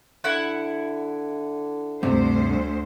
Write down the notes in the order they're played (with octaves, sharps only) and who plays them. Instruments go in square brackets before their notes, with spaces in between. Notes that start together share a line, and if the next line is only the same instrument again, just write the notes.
[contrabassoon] D3 [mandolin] E4 F#5
[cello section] D2 C5 [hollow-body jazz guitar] G2 C3